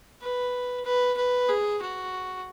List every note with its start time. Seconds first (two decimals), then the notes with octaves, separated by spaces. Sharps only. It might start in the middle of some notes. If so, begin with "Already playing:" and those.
0.21 B4
0.85 B4
1.17 B4
1.49 G#4
1.82 F#4